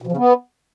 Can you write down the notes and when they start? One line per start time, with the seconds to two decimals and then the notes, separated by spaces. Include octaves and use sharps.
0.02 B2
0.07 F3
0.12 C#3
0.17 B3